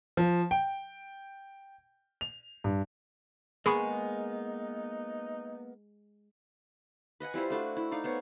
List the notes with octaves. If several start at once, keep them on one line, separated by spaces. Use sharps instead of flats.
F3
G5
F7
G2
G#3 A#3 B3 D#4 G#4 B5 C#6
B4 D#5 F#5 G#5
G3 E4 F4 C5
A3 D4 F#4
E4
D#4 D5 F5
B3 C5 C#5